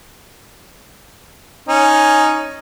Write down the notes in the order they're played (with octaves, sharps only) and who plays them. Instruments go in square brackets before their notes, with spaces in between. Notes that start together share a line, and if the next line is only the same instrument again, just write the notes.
[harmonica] C#4 D#4